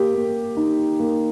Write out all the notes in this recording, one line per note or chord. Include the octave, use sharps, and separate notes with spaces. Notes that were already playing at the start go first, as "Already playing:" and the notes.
Already playing: A#3 G4
A#3
D#4
A#3